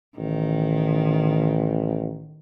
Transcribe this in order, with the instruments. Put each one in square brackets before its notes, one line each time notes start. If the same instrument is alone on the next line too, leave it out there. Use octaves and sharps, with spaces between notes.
[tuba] A1 [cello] D#3